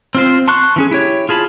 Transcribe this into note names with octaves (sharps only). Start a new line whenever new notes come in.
C4 F4 C5
A5 C6 C#6 F#6
E3 C#4 G#4
E4 G4 C#5
F4 G#4 A5 B5